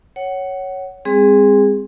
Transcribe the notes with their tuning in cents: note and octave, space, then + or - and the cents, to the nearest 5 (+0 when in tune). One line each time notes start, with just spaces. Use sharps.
C#5 +0 F#5 +20
G#3 -45 C4 +0 G#4 -15